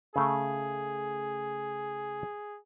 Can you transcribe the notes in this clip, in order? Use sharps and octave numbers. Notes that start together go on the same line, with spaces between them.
C#3 A3 G#4